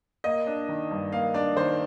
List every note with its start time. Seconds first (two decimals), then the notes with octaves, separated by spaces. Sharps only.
0.24 A#3 D#5
0.47 D4
0.69 D#3
0.91 G2
1.12 A#3 F5
1.34 D4 D5
1.57 D#3 C5